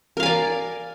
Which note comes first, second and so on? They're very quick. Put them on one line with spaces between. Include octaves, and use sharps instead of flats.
A#4 F5 G#5 D5